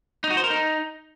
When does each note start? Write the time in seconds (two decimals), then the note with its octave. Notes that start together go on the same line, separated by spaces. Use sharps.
0.24 D#4
0.30 F#4
0.37 C5
0.44 A#4
0.50 D#4